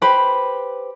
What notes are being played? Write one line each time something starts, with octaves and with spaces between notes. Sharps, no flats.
G4 B4 C5 B5